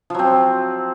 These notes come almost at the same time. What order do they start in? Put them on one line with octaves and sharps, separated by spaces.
F3 F#3 C4